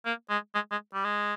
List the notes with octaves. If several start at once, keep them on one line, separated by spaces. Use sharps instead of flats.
A#3
G#3
G#3
G#3
G3
G#3